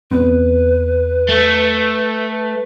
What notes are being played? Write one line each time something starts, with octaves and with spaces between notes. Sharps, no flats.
E2 B3 C4 B4
A3